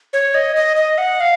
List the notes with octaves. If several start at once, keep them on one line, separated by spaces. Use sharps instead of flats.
C#5
D#5
D#5
D#5
F#5
F5